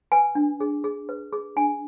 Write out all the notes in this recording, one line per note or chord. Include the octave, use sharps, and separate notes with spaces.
B4 G#5
D4
G#4
G#4
B4
G#4
D4 G#5